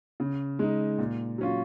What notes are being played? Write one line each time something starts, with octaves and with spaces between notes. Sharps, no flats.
C#3
G#3 D#4
A#2
F#3 C#4 F4